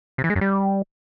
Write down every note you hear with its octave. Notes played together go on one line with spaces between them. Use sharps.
C3
E3
G#3
F#2
G3